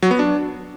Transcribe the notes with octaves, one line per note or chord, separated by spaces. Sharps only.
F#3
B3
D4